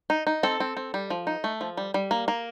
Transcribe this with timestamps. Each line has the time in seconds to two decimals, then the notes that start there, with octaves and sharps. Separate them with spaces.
0.10 D#4
0.27 D#4
0.43 C4 A4
0.60 C4
0.77 C4
0.94 G3
1.10 F3
1.27 D#4
1.44 A3
1.61 F3
1.77 G3
1.94 G3
2.11 A#3
2.28 A#3